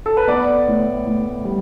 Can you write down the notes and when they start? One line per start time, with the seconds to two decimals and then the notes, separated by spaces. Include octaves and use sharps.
0.06 A4
0.17 B4
0.27 B3 D5
0.67 A2
1.06 A2
1.45 G3